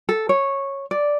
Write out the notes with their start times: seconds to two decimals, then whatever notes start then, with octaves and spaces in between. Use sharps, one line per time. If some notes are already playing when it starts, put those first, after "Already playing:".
0.09 A4
0.29 C#5
0.91 D5